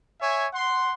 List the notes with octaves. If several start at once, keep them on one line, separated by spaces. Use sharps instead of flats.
C#5 E5 G#5
F#5 C6